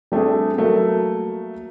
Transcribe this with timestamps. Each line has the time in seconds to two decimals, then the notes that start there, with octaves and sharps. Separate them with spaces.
0.12 G3 A3 C4 D4 G#4
0.58 F#3 A3 A#3